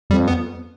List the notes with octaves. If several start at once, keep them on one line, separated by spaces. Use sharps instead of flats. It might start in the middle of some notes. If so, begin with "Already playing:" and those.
F2 G3
B3